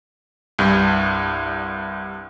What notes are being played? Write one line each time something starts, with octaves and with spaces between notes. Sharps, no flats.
C2 G2